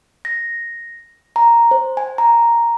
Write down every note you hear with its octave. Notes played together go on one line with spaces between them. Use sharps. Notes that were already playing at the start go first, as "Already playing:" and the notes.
A#6
A#5
C5
G#5
A#5